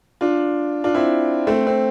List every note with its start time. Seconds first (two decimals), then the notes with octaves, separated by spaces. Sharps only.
0.21 D4 F4
0.84 D4 F4
0.95 C4 E4
1.47 A3 C4
1.67 C4